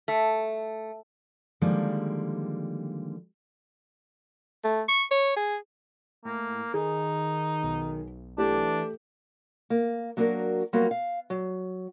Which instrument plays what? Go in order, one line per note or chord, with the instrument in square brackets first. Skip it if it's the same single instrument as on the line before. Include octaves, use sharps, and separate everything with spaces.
[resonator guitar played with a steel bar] A3
[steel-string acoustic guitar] D3 D#3 F3 G3 G#3 A#3
[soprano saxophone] A3
C#6
C#5
G#4
[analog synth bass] A2 [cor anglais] A#3
[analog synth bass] D#3 [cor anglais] D#4 [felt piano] G#4
[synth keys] B1
[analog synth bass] E3 [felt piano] A3 G4 [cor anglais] D4
[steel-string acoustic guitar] A#3
F#3 A#3 B3 D4 F#4 A#4
F#3 G3 A#3 B3 F4 F#4
F5
F#3